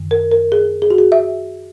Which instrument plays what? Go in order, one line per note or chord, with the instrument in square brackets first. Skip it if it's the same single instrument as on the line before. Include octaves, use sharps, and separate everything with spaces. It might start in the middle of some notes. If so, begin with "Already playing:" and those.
Already playing: [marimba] F#2 D#3
A#4
A#4
G#4
G#4
F#4
G#4
E5